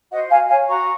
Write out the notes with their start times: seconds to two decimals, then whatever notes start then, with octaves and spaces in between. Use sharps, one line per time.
0.11 F#4 C5 D#5 F#5
0.30 F#4 F5 G#5
0.49 C#5 F5 G#5
0.67 F#4 A#5 C#6